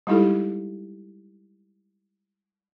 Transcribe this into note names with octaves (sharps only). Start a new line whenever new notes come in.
G3 G#3 D#4 E4 G4 A4